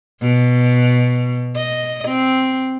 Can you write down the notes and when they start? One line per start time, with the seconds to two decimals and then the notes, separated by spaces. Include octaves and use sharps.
0.21 B2
1.56 D#5
2.08 C4